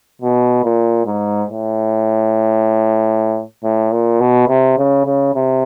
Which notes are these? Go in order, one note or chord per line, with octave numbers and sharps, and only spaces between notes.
B2
A#2
G#2
A2
A2
A#2
B2
C3
C#3
C#3
C3